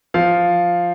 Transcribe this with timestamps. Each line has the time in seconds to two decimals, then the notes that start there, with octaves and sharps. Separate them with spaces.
0.14 F3 F5